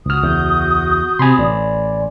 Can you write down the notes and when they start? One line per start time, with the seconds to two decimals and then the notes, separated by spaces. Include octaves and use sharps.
0.06 C#2 F#4 D#6 F6
0.23 E2 G6
1.19 C3 G#5 B5 C6
1.39 A1 D5